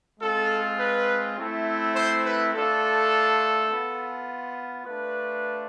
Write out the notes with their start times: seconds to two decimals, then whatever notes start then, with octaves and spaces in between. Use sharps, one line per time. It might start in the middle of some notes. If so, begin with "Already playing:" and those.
0.20 G#3 C4 F4 A4
0.79 B4
1.37 A3 C4 E4
1.94 C5
2.24 B4
2.53 A3 D4 F4 A4
3.69 B3 F4
4.85 A3 D4 F4 B4